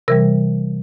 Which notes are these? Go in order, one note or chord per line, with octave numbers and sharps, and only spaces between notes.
C3 E3 G3 A#4